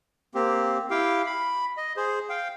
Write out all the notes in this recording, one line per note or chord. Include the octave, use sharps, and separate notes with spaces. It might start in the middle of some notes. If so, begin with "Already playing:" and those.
A#3 C4 G4
E4 G4 F5 G5
B5
D#5
G#4 C5
F5 G5